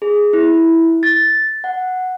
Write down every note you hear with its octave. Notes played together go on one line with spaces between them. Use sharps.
G#4
E4
A6
F#5